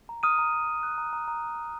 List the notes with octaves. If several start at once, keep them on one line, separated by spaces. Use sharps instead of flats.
A#5
D#6 F6 D#7
A#5
F6
A#5
F#6
A#5
A#5
A#5